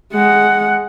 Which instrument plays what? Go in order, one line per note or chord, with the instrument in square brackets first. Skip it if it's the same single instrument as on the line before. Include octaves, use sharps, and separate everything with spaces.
[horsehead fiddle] G#3 F#5